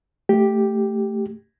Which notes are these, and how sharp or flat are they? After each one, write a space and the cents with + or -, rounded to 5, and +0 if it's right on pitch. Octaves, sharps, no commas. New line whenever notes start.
A3 +0 G4 +0